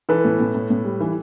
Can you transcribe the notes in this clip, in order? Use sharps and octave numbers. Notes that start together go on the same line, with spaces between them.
E3 A4 B4
A2
A2
A2
A2
G3
E3